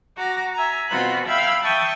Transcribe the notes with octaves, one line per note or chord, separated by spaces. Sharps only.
F#4 A#5 D6 A#6
E5 G#5 A#5
B2 C4 F4 F#4 B5 F#6
E5 F5 G5 B5 E6 G#6
E5 G5 A5 C#6 D#6